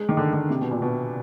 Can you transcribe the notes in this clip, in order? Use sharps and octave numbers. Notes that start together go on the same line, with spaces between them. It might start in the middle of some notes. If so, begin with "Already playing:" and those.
Already playing: G#3
D#3
D3
D3
C3
B2
A#2
B2